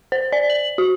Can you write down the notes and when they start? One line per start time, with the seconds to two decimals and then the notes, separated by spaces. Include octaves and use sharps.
0.12 C5
0.32 D5
0.50 F#7
0.78 F#4